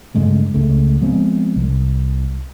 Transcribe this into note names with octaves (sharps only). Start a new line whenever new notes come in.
G2 C#3 G#3 A3
C#2 C#3 A3
F3 G#3 B3 C4
C2